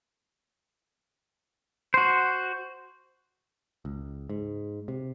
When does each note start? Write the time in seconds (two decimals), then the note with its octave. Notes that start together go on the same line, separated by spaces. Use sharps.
1.94 F#4 C5
3.85 C#2
4.30 G#2
4.88 C3